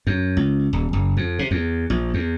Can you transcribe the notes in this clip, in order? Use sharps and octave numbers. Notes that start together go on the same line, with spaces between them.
F#2
C#2
D#1
F#1
F2
C3
E2
A#1
E2